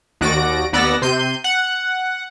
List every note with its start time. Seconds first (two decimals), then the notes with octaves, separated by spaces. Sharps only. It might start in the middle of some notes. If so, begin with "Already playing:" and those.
0.21 D#2 F#4 D5 A#6 D7
0.73 D#2 B3 D5 F#5 E6 A#6
1.02 C3 C6 G6 D#7
1.44 F#5